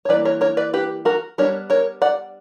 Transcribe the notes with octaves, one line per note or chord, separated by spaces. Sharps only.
C#5
E3 G3 A#3 B4 D5
A#4 C#5
A#4 C#5
B4 D5
G4 B4
F#4 A#4
G3 B3 D4 A#4 C#5
A#4 C#5
D5 F#5